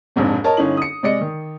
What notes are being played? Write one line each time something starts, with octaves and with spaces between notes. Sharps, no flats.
E1 A#1 F2 G#2 C3
A#4 C#5 D#5 A5
G1 C#4 D#4 E4 F#7
D#6 C#7
C3 G#3 D5 D#5 C#7
D#3